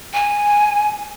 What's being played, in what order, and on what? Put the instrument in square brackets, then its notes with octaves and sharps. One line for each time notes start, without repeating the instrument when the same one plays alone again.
[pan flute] G#5